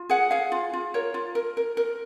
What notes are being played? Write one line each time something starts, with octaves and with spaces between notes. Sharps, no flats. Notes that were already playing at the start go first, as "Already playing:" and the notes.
Already playing: F4
G#4 F#5
G#4 F5
F4
F4
A#4 C#5
F4
A#4
A#4
A#4